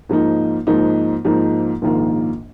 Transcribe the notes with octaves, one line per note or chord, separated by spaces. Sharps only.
G#2 F3 A#3 D#4
G#2 F3 A#3 D#4
G#2 F3 A#3 D#4
A#1 G#2 D#3 A#3 F4